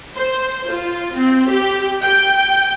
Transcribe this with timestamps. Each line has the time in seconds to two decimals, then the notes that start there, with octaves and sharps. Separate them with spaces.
0.16 C5
0.70 F4
1.17 C4
1.50 G4
2.03 G5